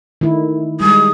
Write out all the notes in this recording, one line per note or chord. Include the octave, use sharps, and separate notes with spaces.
D#3 A3 E4
G3 G#3 D#6